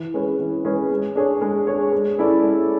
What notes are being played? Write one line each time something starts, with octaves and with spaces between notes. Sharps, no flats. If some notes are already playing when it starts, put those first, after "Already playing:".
Already playing: E3
G#3 C#4 G#4 B4
E3
G#3 C#4 G#4 B4
G#3
D4 G#4 C#5
G#3
D4 G#4 C#5
G#3
C#4 E4 A4 D5
G#3